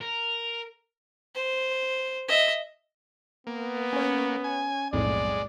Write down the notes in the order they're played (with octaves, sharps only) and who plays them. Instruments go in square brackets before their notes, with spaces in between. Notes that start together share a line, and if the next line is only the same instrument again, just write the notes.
[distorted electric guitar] A#4
[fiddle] C5
D#5 E5
[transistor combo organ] A#3 [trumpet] B3
[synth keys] C#4 C#5
[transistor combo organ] G#5
[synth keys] B1 F2 A2 [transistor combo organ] G#3 [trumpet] D5